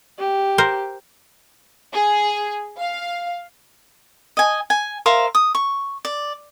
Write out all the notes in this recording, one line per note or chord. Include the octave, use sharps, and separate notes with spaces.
G4
A#4 C5
G#4
F5
D#5 G#5
G#5
A#4 C5 E5 F5
D#6
C#6
D5